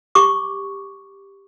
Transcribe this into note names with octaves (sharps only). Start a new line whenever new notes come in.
G4 C#6 D6